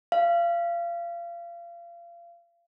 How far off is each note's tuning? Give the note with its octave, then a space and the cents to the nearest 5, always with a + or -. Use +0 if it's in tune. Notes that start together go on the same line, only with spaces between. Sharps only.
F5 -30